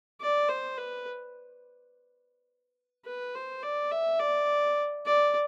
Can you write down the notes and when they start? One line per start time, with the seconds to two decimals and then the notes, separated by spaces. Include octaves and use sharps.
0.21 D5
0.49 C5
0.78 B4
3.06 B4
3.35 C5
3.63 D5
3.92 E5
4.20 D5
5.06 D5